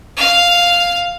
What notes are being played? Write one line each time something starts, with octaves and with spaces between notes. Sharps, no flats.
F5